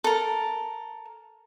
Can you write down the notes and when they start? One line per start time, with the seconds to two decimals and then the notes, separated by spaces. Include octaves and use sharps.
0.04 A4 A#4